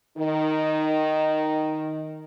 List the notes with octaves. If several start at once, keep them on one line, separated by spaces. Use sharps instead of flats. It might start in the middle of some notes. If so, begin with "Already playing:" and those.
D#3 D#4